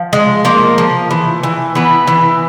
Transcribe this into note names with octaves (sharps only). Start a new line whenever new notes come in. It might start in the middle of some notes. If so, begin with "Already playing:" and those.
Already playing: F3
G#3
F3 A#3 A#4
F3
E3
E3
E3 B3 B4
E3